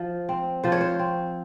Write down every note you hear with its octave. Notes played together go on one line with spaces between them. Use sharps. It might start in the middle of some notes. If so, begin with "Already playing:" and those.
Already playing: F3
C4
F3 C5
C#5
C5
C4